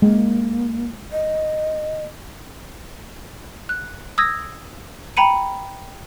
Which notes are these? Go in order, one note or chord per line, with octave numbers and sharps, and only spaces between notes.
G#3 A#3
D#5
F#6
D#6 E6 G#6 A#6
G5 A#5 B5 C#7 D#7